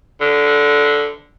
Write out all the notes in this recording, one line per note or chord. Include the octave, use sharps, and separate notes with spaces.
D3